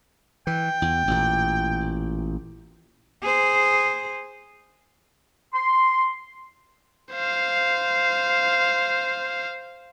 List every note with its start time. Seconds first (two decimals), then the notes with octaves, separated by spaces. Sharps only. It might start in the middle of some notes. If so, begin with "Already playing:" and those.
0.47 E3 G5
0.82 E2
1.08 A1 A#2
3.22 G#4 C5
5.53 C6
7.13 C5 F5